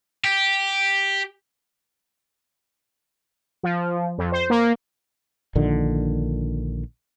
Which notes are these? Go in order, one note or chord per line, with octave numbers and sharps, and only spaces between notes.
G4
F3
F2
C5
A#3
A#1 A#2 D3 D#3